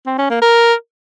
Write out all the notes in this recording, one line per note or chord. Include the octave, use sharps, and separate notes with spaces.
C4
C#4
A#3
A#4